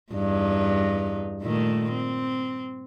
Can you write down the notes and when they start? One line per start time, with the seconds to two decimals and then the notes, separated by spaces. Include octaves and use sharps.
0.13 E2 G2 D#4
1.42 A#2 D#3 A3
1.91 C4